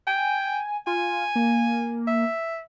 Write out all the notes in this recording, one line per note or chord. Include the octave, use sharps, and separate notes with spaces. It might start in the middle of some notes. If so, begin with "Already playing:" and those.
G5 G#5
F4 G#5
A#3
E5